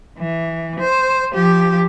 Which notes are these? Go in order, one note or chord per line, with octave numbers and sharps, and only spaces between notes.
E3
C5
F3 G4